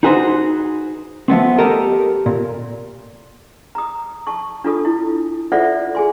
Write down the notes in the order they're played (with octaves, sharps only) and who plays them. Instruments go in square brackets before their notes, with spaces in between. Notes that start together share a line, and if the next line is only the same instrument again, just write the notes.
[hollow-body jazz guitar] D#4 F#4 G#4 B4 C5
F3 A3 B3 C4
G4 A4 A#4 D#5
A#2
[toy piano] A#5 D#6
A5 C#6
D4 F4 A4 D#6
E4
F4 A4 C5 D5 E5 F#5
G#4 G#5 C6